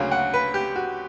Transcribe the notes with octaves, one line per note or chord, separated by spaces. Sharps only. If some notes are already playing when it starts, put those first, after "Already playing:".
Already playing: D2 C#3 F#3 A#3
F#5
B4
G4
F#4